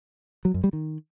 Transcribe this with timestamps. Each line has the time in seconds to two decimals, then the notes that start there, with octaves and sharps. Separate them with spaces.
0.45 F#3
0.54 F#2
0.64 G3
0.73 D#3